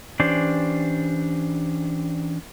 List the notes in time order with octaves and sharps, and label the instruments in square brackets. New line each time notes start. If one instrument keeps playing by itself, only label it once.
[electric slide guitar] E3 C#4 D4 G4 C5 D5